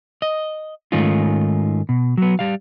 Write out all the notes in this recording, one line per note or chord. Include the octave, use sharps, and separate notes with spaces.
D#5
G#2 D#3 A3 C#4 D#4 F4
B2
F#3 B3
G3 F5